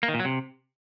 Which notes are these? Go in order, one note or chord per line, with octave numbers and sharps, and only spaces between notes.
A#3
D#3
A#2
F#3
C3